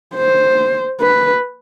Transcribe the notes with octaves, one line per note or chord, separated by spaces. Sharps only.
C5
B4